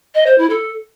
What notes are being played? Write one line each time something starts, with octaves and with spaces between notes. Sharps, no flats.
D#5
C5
E4
A4